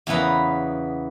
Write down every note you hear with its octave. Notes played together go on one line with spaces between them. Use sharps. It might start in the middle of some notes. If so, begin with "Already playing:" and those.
E2 C#3 B3 B4 A#5